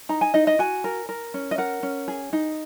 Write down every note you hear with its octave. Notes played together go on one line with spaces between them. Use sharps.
D#4 A#5
G#5
D#4 D#5
D#5
F#4 G#5
A#4
A#4
C#4
D#5
A#4 F#5
C#4
G#4
D#4